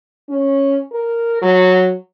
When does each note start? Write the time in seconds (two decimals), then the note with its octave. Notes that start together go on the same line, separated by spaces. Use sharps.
0.29 C#4
0.92 A#4
1.42 F#3